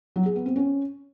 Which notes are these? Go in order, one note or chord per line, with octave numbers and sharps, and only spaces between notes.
F#3
G#4
B3
C4
C#4